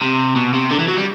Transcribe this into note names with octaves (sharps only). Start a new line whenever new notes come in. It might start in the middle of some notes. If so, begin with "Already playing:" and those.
C3
B2
C3
D3
E3
F#3
G3